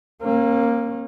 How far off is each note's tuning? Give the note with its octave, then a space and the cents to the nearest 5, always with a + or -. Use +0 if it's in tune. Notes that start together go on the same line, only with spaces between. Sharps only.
A#3 +0 C#4 -45